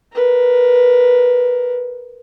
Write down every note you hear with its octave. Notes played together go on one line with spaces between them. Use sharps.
A#4 B4